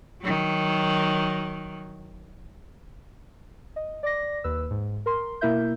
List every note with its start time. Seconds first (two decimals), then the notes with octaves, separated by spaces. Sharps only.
0.21 D#3 F#3
3.76 D#5
4.03 D5 D6 A#6
4.44 D#2 B4 E6
4.71 G#2
5.06 A#4 C6
5.41 B2 A#3 E4 A#4 E5 G6